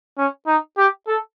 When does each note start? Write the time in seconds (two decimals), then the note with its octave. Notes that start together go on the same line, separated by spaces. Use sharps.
0.18 C#4
0.47 D#4
0.78 G4
1.07 A4